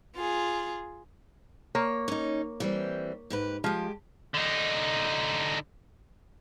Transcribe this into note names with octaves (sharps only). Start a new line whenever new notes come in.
F4 G#4
A#3 C#5
C#4 D#4
E3 G3 C4
G#2 G4 B4
F3 G#3 G4
D3 D#4